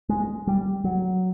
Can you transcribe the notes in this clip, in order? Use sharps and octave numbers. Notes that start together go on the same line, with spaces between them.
G#3
G3
F#3